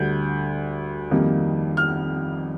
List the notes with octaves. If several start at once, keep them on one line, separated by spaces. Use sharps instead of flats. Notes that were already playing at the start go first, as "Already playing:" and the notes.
Already playing: D2 D3 G3 G6
F2 D#3 G3 A#3
F6